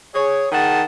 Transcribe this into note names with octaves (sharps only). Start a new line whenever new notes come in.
G#4 C#5
D#3 G#4 F#5 A5